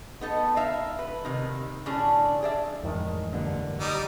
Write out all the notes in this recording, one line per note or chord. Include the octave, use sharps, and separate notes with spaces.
B3 D#4 A4
D#4 E5 F5
B4
C3 D#3
A2 D3 C#4 D4 G#4
G#4 D5 E5
F2 A2 D#3 E3 G#3
G2 A#2 D3
G3 D#4